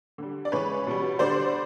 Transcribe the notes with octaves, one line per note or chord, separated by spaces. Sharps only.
D3 G3
D5
C#3 E3 G#3 B4 C#5
B2 G3
D3 G3 C5 D5